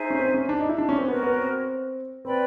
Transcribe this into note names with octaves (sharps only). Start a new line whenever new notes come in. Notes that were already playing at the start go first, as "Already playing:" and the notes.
Already playing: D#4 G#4 C5 E5
C#4
C4
C#4
D4
D#4
E4
D4
C#4
C4
B3 F#4 A#4 C#5
B3
C4
C4 B4 D5 G5 B5